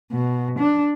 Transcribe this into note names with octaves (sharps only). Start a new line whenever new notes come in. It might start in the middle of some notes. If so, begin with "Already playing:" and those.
B2
D4